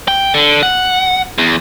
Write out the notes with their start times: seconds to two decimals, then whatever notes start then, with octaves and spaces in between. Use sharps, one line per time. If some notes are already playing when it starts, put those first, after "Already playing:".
0.08 G5
0.34 D3
0.63 F#5
1.38 E2